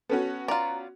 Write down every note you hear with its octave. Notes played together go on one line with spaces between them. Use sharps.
B3 C#4 F#4 A4
F4 D5 A#5